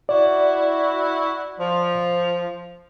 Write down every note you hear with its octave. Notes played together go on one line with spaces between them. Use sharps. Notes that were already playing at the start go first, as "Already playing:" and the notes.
E4 F#4 D5
F3